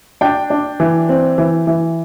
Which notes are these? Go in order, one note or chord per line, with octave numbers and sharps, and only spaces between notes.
D4 G5
D4
E3
C4
E3
E3